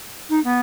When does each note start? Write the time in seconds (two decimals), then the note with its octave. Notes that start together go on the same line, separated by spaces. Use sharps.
0.29 D#4
0.44 B3